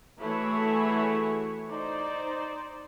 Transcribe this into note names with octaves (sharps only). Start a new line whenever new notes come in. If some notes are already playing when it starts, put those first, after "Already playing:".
E3 A3 E4 F#4 G#4 C#5
D#4 C5 D5